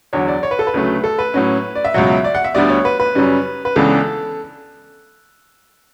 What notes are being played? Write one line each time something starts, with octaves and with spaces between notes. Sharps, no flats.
E2 D3 F#3 C#5
D5
C#5
B4
A4
B4
D2 C#3 F#3 A3
A4
B4
A2 F#3 C#4
D5
E5
C#2 B2 F#3 F#5
E5
D5
F#5
E5
D2 D3 G3 B3 D5
C#5
B4
B4
F#2 C#3 G3 C#4
B4
C#2 C#3 E3 B3 D4 A4